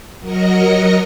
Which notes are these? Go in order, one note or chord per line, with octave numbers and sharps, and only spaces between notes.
F#3 F#4 A#4 D#5 A#6 C#7